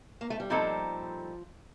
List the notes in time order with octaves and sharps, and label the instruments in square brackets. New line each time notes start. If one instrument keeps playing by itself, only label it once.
[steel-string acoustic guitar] A#3
A3
G3
[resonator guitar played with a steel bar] A#2 G3 C4 D#4 A4 [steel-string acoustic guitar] F3